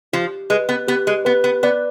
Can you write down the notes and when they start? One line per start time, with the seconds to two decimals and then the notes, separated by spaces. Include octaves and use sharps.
0.13 F3 G4
0.50 G#3 B4
0.69 B3
0.88 B3 G4
1.07 G#3
1.25 B3 B4
1.44 B3
1.63 B3 D5